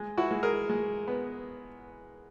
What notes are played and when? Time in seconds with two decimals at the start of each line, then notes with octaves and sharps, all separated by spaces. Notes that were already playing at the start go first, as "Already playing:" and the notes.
Already playing: G#3
0.18 E4 F#4
0.31 G#3
0.43 G#4 A#4
0.69 G#3
1.08 B3